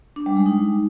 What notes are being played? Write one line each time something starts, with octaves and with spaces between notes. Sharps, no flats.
D4
G3
G#3
D#4